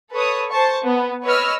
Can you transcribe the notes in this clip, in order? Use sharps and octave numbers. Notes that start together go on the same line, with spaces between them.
A4 B4 C#5 D#6
C5 A5 C#6
B3
B4 C#5 D#5 E6 F6